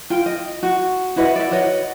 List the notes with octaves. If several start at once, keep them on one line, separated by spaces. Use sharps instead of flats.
F4 G5
D#5
F#4
E4 F#4 B4 D#5
D5 E5
F#4 B4 C#5 D#5